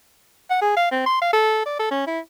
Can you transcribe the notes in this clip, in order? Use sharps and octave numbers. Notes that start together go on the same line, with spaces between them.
F#5
G#4
F5
C4
C6
F5
A4
D5
A4
C#4
E4